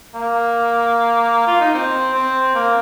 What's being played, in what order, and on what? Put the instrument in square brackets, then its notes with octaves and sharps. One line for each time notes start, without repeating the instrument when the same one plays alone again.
[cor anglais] A#3
F4
D#4
C4
C4
A#3